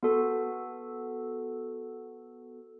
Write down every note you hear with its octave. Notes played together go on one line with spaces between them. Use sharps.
B3 F#4 A4